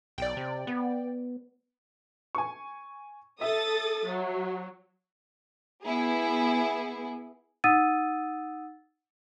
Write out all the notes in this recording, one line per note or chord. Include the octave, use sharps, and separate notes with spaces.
B1 D5 G5
C3
B3
G#5 C#6
A4 E5 D#6 A6
F#3
B3 E4 G#4
D#4 F#5 D#6 E6 A6 D#7